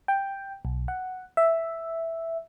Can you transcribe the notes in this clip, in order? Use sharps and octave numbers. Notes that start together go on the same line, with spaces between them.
G5
B1
F#5
E5